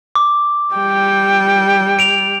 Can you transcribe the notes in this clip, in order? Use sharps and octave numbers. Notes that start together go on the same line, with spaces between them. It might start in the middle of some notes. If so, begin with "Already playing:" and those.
D6
G3 G5
D7 F7